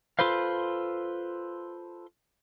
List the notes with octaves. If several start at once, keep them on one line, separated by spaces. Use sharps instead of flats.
F4 A4 B4 C5 F5